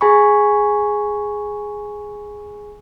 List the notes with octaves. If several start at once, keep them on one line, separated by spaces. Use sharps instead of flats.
G#4 G#5 B5 C#6